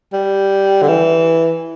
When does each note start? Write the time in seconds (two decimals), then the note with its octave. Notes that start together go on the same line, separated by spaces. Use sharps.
0.13 G3
0.82 D3
0.88 E3